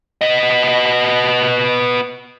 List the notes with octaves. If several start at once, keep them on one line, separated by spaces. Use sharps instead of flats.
B3 D#5